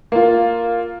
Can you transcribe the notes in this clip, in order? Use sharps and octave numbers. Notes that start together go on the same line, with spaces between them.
A#3 F4